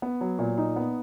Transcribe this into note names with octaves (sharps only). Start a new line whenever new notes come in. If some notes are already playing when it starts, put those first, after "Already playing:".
B3
F#3
A#2
D#4
B3